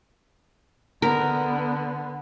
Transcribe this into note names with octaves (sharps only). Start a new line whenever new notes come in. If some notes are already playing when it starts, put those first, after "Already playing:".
D3 B3 A#4